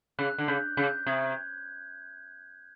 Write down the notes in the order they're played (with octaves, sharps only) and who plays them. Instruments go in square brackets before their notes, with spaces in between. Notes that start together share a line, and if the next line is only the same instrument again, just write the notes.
[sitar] C#3 [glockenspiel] F#6
[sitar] D3
[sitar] C#3 [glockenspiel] G6
[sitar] C#3 [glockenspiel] G6
[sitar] C3 [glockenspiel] G#6